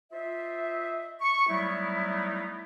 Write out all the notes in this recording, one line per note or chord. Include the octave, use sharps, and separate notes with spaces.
F4 C5 D#5 E5
C#6
F#3 G3 A3 B3 D#4 E4